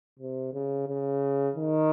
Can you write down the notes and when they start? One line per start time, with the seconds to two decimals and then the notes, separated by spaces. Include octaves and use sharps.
0.19 C3
0.54 C#3
0.88 C#3
1.56 D#3